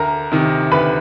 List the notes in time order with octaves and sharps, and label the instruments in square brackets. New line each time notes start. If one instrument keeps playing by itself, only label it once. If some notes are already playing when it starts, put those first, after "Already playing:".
Already playing: [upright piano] D2 A#4 A#5
C3 D#3
D2 B4 B5